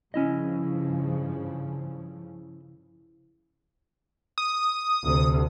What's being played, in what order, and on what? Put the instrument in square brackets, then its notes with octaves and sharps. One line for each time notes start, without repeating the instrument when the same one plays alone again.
[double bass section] G2 C#3 F3 [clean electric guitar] C#4 E4 D#5
[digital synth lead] D#6
[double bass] D2 C3